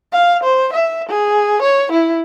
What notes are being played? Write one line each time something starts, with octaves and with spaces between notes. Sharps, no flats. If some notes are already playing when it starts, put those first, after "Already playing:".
F5
C5
E5
G#4
C#5
E4